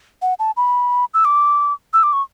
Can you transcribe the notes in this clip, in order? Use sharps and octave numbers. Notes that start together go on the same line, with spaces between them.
F#5
A5
B5
E6
D6
E6
D6
C#6